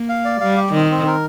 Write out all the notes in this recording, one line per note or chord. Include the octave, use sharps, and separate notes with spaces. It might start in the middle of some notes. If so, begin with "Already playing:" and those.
Already playing: A#3
F5
D5
G3 F5
G4
D#3 C4
C4
A#4